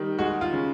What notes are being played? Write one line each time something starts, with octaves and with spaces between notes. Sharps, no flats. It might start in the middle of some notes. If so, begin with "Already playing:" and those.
Already playing: D#3 G3
G#3 F#4
F4
C#3